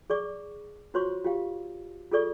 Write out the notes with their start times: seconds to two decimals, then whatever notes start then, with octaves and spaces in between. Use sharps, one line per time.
0.10 G#4 D5 C#6 D6
0.94 F4 F#4 C5 C#5 C6 C#6
1.24 F4 G4 F5
2.11 F4 G#4 A4 D5 C#6